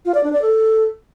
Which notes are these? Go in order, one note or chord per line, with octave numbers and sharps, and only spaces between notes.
F4
D5
D4
D5
A4